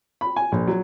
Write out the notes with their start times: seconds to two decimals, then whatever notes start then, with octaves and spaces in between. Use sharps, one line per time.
0.21 B5
0.36 G#5
0.52 A#1
0.67 F#3